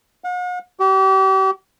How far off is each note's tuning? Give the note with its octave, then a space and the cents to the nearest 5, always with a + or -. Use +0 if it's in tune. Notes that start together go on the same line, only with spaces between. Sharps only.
F#5 -45
G4 -35